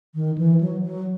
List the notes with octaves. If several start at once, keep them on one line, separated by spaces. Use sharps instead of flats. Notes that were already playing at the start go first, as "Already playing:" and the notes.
D#3
E3
F#3
F#3